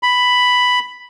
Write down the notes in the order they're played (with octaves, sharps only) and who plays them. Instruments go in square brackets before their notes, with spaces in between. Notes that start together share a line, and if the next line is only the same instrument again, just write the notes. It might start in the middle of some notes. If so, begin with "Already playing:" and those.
[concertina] B5